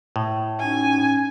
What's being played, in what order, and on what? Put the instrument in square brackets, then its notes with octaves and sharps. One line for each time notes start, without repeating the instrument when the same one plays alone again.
[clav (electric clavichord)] A2
[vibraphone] C#4 D#4 F#4 [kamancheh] G#5